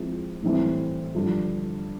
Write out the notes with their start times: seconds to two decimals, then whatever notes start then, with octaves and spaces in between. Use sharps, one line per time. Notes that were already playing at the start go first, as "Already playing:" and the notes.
Already playing: F3 G#3 C4 E4
0.43 A2 E3 G3 C4 E4
1.15 G2 D3 F3